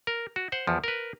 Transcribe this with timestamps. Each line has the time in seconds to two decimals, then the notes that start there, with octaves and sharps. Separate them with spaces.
0.07 A#4
0.36 F#4
0.52 C5 F#5
0.67 E2 F3
0.84 A#4 B4